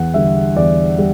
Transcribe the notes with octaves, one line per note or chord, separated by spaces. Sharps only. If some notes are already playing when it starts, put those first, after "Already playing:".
Already playing: E2 F#5
D3 G3 E5
E2 D5
G3